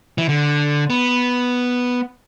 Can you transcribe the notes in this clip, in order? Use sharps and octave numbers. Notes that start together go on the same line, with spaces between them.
E3
D3
B3